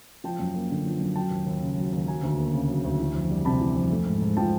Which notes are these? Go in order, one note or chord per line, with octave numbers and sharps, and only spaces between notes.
F3 G5 A5
F#2
A#3
D3
F3
F#2
F#3 G5 A5
D#2
D#2
C#3
F#3
D#2
F#3 G#5 A#5
D2
A#3
C#3
F#3
D2
E3
F2
G3
C3 A5 B5
E3
F2
A3
G#2
G#2
F3 G5 A5